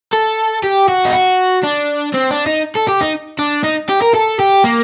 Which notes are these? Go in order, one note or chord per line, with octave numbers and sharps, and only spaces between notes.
A4
G4
F#4
D#4
F#4
D4
C4
D4
D#4
A4
G4
D#4
D4
D#4
G4
A#4
A4
G4
A#3